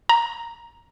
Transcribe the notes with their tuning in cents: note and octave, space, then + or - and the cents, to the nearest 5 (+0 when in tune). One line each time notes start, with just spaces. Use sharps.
A#5 +10